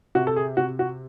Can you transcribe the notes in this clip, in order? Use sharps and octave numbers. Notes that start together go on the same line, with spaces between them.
C3 F#4
A4
G#4
C3 F#4
F#4